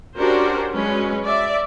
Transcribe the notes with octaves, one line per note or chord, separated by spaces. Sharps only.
C#4 D4 F#4 G4 A#4 C5
F#3 G#3 C#4 B4
D5 E5